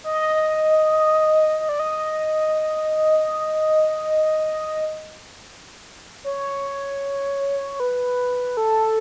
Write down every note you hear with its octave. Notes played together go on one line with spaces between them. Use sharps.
D#5
D#5
D5
D#5
C#5
B4
A4